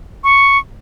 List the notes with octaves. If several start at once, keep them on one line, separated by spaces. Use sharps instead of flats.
C#6